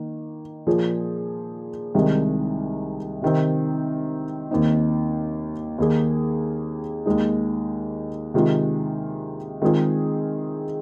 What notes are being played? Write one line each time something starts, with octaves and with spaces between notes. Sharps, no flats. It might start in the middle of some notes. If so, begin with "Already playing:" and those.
Already playing: D#3 A#3
A#2 F3 A#3 G#4
C2 C3 D#3 G#3
C3 D#3 C4
D#2 D#3 C4 D#4
D#2 D#3 A#3 G#4
D#2 D#3 G#3 D#4
C3 D#3 G#3 F4
D#3 G#3 C4 F4 G#4